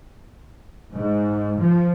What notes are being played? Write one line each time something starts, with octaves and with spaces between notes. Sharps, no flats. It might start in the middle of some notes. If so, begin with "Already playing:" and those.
G#2
F3